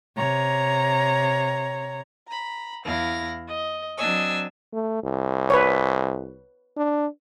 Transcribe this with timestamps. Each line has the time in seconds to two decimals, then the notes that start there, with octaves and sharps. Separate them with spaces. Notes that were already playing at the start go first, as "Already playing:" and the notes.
0.17 C3 C#5 A#5
2.28 A#5 B5
2.84 E2 E4 F5 A#6
3.48 D#5
3.97 F#3 C4 D4 D#5 G#5 E6
4.73 A3
5.03 C2
5.50 B4 C#5
6.77 D4